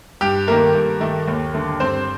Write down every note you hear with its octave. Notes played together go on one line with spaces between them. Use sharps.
G2 G4
D#3 A3 A#3 A#4
G2
D#3 A3
D#2
D3 A3
G2 C4 C5